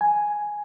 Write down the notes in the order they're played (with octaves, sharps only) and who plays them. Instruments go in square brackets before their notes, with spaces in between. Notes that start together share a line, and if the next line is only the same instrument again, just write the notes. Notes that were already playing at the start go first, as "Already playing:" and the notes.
[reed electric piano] G#5